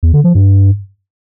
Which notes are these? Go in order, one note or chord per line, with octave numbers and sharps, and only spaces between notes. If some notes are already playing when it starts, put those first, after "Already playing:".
E2
D3
F3
G2